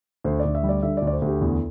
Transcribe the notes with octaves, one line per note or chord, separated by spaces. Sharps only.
D2 C5
D5
D2
E5
G3
D5
D3 E5
D5
D2
D5
C5
D2 G4
E2 E4